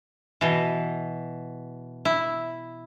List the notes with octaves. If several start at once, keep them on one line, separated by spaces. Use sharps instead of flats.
B2 E3
E4